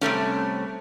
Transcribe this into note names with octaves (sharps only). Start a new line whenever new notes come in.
C3 G3 A3 C#4